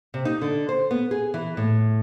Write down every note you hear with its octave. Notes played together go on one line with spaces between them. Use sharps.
C3
D#4
D3
C5
B3
G#4
E3
A2